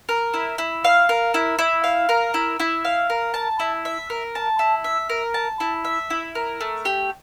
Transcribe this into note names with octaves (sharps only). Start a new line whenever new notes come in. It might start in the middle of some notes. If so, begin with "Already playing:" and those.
A#4
E4
E4
F5
A#4
E4
E4
F5
A#4
E4
E4
F5
A#4
A5
E4
E5
A#4
A5
E4
E5
A#4
A5
E4
E5
E4
A#4
A3
G4